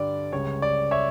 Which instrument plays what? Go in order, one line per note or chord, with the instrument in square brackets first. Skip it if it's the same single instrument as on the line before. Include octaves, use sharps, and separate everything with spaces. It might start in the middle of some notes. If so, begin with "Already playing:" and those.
Already playing: [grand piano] G2 D3 G3 D5
C#2 C#3 G3 C#5
D5
C#5 E5